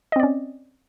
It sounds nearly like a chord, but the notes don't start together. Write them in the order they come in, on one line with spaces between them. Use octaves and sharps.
D#5 C4 D5 C#4